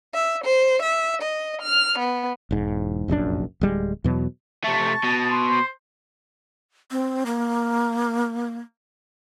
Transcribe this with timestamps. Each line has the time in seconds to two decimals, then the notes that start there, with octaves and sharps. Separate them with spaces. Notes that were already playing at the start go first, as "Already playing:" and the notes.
0.15 E5
0.45 C5
0.83 E5
1.22 D#5
1.62 F6
1.99 B3
2.51 E1 G#2
3.08 F1 A#1 F#2 D4
3.61 D1 G3 G#3
4.04 E2 B2 F#3
4.64 C3 A3 A5 C#6
5.04 B2
5.31 C6
5.50 C5
6.91 C4
7.26 A#3